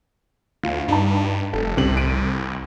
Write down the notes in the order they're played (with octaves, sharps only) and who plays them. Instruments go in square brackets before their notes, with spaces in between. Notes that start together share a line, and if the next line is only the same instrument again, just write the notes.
[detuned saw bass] D2 [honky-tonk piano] F4
[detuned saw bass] G2 [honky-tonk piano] D#4 A5
[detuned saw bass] F1 [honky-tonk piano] A4
[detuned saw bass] C2 [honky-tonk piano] C3 C4 F#7
[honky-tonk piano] B6 D7 D#7